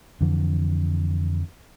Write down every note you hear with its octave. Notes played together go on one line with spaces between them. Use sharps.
F2 D3 E3